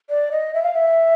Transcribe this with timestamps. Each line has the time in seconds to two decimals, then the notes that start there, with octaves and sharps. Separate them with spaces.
0.10 D5
0.31 D#5
0.54 E5
0.63 F5
0.74 E5